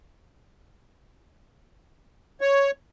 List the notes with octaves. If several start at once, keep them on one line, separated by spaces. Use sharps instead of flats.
C#5